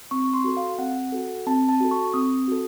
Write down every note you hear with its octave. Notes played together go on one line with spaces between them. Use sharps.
C4 C#6
C6
F#4 A4
F5
C4 F#5
F#4 A4
C4 A5
A5
F#4 A4
C#6
C4 D#6
F#4 A4